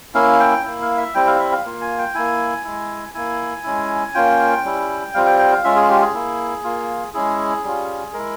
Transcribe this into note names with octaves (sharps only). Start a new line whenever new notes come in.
A#3 C#4 E4 F5
G5
A#3 E4
F5
E5
G3 C4 E4 G5
F5
E5
F5
A#3 F4
G#5
G5
A#3 E4 G#5
G#3 E4
A#3 E4 G#5
G#3 C#4 E4
A#3 C#4 F4 G5
G3 C#4 E4
G3 C4 F4 F5
G5
G5
F5
G#3 C#4 F4 E5
G#4
G4
G#4
A#3 E4
A#3 F4
G#3 C#4 E4 G#4
G3 C#4 F4
G#3 E4 A#4